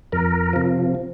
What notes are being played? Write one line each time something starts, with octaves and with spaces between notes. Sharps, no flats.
F2 A#4
C3 F3